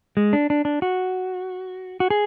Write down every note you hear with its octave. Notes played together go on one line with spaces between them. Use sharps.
G#3
D4
D4
D4
F#4
F#4
G#4